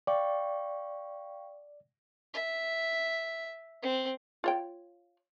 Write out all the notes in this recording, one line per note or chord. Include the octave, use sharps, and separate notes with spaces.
D5 F5 G5 C#6
E5
C4
F4 C#5 G5